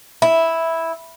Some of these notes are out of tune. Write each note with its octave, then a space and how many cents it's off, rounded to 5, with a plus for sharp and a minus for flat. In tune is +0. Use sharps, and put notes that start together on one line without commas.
E4 -5